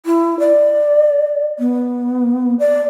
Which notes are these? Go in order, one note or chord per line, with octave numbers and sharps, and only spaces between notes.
E4
D5
B3
D5